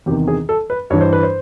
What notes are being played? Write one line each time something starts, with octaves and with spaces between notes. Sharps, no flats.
E2 C3 D#3 G4
G#4
A4
B4
G2 E3 C#5
C5
B4
C5